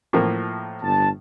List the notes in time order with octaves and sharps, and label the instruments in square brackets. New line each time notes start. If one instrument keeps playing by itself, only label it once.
[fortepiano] A2 F3 A#3
[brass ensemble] G1 A5